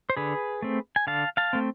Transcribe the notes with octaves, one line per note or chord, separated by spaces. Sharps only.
C5
D3 G#4 B4
A3 C4
G#5
D3 F5 A5
F5 A5
A3 C4